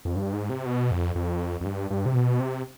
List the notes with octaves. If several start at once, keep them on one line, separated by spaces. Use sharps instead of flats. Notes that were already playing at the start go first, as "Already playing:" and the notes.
F2
G2
G#2
C3
B2
F2
F2
F2
G2
G2
C3
B2
C3